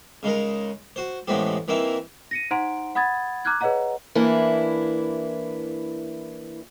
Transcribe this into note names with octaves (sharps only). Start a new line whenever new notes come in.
C#3 G#3 D#4 A#4
F#4 C5
A1 A2 G#3 B3 C4 G4
E3 A#3 C4 D#4 E4
A#6 C#7 D#7
D#4 C5 F#5 A#5 C6 D7
F#5 B5 D#6 G#6 A6
A#5 D6 F6 F#6 G#6
G#4 B4 C#5 D#5 F#5 A#5
E3 A#3 D4 E4